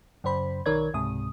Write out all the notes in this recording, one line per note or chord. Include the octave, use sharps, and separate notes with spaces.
F#2 C#3 C5 B5
B1 D#3 A#4 C#5 D5 G#6
C#2 G#2 C3 D#6